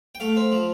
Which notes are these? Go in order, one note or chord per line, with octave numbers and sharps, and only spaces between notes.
G5
A3 F5
C4
F3